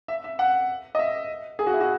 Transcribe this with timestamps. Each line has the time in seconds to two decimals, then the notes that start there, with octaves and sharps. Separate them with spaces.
0.08 E5
0.24 E5
0.39 F#5
0.95 D#5
0.99 E5
1.59 G#4
1.67 F#4
1.74 E4
1.81 F#4